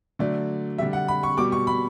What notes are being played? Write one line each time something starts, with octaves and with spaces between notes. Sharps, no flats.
D3 F#3 A3 D5
D3 G3 E5
F#5
B5
C#6
B2 G3 D6
C#6
B5